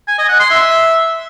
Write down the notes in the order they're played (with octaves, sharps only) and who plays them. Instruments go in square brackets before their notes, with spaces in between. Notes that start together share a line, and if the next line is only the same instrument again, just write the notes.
[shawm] G#5
D#5
F#5
C6
E5